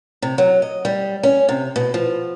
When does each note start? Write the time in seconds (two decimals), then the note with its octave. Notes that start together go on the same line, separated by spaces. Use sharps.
0.22 C3
0.38 F#3
0.62 D#5
0.85 G3
1.23 C#4
1.49 C3
1.76 B2
1.94 F3